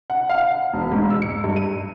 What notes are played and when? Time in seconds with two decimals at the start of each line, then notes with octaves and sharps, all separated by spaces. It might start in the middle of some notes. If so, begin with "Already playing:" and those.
0.10 F#5
0.30 F5
0.44 F#5
0.73 E1
0.92 G#2
1.10 E6
1.22 C#7
1.44 G2
1.56 D#7